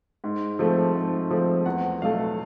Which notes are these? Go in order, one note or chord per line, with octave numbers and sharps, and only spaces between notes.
G#2
F3 A3 C4
G#2
F3 A3 C4
E2 F#5
B2 F#3 A3 F5